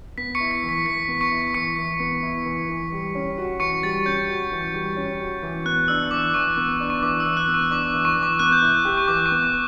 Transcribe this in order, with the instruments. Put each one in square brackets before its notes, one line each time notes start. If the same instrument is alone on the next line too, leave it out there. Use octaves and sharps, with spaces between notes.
[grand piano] B3 [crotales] B6
[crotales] C#6 C#7
[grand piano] E4
[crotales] B6
[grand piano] E3
[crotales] B6
[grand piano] E3 [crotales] B6
[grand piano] B3
[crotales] C#6 C#7
[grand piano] E4
[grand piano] E3 [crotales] C#6 C#7
[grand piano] E3
B3
E4
E3
E3
G3
C#4
F#4
[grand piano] E3 [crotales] C#6 C#7
[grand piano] G3 [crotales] A6
[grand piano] C#4 [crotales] G6
[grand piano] F#4
E3
G3
C#4
F#4
E3
[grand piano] B3 [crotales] F#6
[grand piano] D4 [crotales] E6
[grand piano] E3 [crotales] D6
[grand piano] E3 [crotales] C#6
[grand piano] B3
D4
[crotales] C#6
[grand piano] E3 [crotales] D6
[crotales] E6
[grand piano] E3
[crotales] F#6
[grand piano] B3
[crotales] C#6
[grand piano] D4 [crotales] D6
[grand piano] E3
[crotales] C#6
[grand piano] E3
[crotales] D6
[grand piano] B3 [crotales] F#6
[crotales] G6
[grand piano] E4 [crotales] F#6
[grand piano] G4
[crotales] C#6
[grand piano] E3 [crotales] D6
[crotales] C#6
[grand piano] B3
[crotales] D6